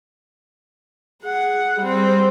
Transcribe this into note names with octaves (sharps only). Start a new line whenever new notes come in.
G#4 F#5
G3 C4